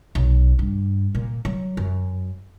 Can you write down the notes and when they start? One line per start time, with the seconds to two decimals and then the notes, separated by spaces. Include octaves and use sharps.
0.15 B1
0.59 G2
1.15 A#2
1.45 F#3
1.77 F#2